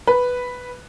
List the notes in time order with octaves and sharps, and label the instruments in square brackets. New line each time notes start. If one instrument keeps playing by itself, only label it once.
[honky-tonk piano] B4